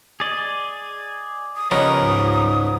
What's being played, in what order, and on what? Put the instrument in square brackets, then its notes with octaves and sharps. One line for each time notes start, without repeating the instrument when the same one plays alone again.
[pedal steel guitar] G#4 D5 D#5
[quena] D#6
[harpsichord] C#3 B3 [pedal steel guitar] F3 G3 A#4 [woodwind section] C#5 D#5 [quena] D#6
[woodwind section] C#2 G#2